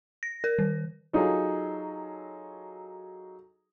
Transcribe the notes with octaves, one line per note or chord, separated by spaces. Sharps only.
A#6
A#4
D#3
F#3 D#4 F4 G#4 A4